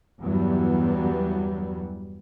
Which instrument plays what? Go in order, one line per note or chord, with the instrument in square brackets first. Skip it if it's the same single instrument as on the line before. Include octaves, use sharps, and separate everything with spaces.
[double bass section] E2 G2 E3 F#3 G3 B3